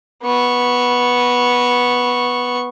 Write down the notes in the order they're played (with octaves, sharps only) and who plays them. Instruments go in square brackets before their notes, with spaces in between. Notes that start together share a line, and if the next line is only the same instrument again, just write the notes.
[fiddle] B3 C#6